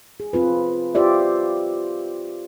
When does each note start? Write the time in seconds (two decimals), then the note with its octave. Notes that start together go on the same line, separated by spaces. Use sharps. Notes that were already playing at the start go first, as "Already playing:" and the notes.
0.20 G#4
0.33 C4 F4 B4
0.95 F4 G4 C5 D5 E5